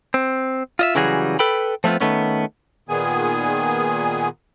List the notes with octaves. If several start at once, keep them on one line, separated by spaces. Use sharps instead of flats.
C4
F4 D#5 E5
C#3 E3 F#3 G3 F#4 G#4
A4 B4 G5 B5
F3 A3 B3 C4 F4
D#3 A3 B3 C#4
A#2 D#3 B3 G#4 G#5